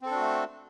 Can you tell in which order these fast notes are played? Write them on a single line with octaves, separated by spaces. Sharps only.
C4 A4 D4 F#4 A3